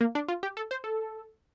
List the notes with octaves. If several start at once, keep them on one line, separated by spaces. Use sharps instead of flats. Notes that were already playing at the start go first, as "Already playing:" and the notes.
A#3
D4
F4
G4
A4
C5
A4